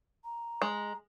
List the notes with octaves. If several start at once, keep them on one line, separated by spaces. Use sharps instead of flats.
A#5
G#3